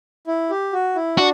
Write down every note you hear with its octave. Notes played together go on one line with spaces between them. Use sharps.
E4
G4
F#4
E4
D4 F#4